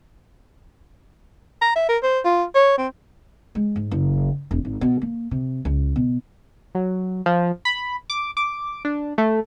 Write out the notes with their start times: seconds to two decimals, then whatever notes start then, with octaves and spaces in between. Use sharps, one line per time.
1.62 A#5
1.76 E5
1.89 A#4
2.03 C5
2.25 F4
2.55 C#5
2.78 C4
3.55 G#3
3.76 G#2
3.91 F#1
4.51 E1
4.65 G#1
4.81 B2
5.02 A#3
5.31 C3
5.65 C#2
5.96 B2
6.75 F#3
7.26 F3
7.65 B5
8.10 D6
8.37 D6
8.85 D4
9.18 A3